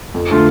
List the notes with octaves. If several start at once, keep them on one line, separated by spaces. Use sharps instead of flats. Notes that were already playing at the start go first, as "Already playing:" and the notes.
F2
D3 A3 F4